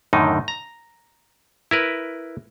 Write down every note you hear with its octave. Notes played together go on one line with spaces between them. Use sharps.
F#2 A2 D3 D#3 D#4
A#5
E4 A#4 B4